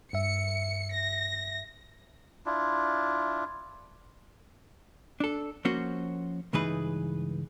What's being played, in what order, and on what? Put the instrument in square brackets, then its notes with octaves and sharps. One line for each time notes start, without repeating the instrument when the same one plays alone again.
[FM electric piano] G2 E5 [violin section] C#7
[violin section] A#6
[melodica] D4 E4 F4
[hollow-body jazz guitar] D4 A4
F3 A#3 C#4 F#4 C5
C#2 G2 E3 D#4 G#4 B4